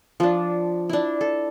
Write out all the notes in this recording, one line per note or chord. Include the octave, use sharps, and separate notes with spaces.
F3 D4
D4 E4
A4